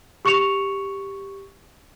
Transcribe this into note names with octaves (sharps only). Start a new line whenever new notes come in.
G4 C#6 C#7 E7 F7